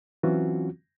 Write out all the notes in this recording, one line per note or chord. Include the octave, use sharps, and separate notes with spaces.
E3 F#3 C4 C#4 F4 F#4